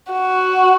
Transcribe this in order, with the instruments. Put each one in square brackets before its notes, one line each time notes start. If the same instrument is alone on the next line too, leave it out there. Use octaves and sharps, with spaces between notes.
[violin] F#4